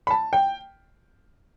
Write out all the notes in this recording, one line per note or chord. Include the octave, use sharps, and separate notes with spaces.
B5
A5
G5